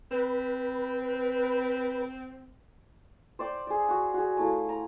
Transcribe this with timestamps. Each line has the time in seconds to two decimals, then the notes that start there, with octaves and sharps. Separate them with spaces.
0.11 C4 B4
3.39 C5 D5 G5
3.67 G#4 D5
3.88 F#4 F#5
4.14 F#4 G#4
4.37 A3 E4 F4
4.69 A#5